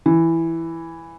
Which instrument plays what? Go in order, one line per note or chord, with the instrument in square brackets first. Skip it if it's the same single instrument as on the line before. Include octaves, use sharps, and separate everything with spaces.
[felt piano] E3